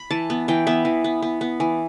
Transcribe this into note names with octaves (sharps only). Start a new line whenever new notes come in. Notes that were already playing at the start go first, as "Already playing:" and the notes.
Already playing: B5
E3 A5
B3
E3 G5
B3 E5
E3
B3
B3
B3
E3